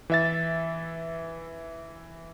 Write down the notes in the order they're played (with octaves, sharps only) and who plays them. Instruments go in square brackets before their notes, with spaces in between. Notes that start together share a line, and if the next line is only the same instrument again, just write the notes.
[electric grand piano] E3 E5 A6